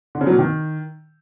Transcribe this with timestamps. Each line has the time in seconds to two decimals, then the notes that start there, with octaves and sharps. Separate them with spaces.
0.15 D3
0.21 C#3
0.27 F#3
0.33 A#2
0.39 D#3